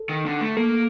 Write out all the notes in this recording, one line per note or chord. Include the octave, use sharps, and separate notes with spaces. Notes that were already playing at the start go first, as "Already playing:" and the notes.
Already playing: A4
D#3
D3
A3
A#3 A4